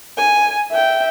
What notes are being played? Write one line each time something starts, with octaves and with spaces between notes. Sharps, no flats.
G#5
E5 G5